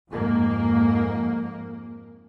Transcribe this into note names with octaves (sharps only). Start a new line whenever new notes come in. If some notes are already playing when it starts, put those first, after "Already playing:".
F2 G#2 A#3